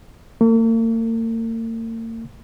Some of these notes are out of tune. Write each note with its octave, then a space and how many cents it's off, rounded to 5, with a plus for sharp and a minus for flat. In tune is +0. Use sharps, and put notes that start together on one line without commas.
A#3 -45